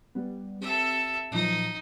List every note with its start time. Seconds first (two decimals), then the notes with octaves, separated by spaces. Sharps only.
0.15 G3 B3
0.61 C4 G4 A4 E5
1.32 A#2 F3 F#3 D#4